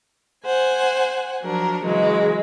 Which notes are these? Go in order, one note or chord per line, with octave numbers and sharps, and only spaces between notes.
C5 F#5 G#5
F3 F#3 D4 A#4
C#3 E3 F#3 G#3